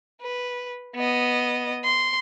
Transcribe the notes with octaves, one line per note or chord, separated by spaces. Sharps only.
B4
B3 D#5
C6